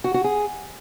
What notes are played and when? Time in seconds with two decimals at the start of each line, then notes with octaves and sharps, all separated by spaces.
0.04 F#4
0.14 F#4
0.24 G#4